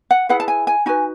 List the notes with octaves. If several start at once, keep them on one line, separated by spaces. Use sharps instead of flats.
F#5
E4 G#4 B4 F#5
A5
G#5
G#5
D#4 F#4 B4 G#5